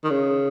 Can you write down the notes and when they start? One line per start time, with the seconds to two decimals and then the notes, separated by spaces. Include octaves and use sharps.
0.04 D#3
0.10 C#3